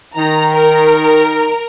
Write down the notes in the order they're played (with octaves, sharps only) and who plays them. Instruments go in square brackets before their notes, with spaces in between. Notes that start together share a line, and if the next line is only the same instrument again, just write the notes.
[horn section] D#3 [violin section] A#5
[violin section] A#4